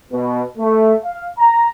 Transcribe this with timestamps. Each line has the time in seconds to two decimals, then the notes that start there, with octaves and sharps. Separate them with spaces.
0.11 B2
0.58 A3
1.03 F5
1.38 A#5